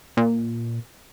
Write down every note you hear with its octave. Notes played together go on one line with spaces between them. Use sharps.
A#2